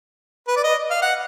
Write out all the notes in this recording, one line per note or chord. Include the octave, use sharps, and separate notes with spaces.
B4
D5
D#5
F5
F#5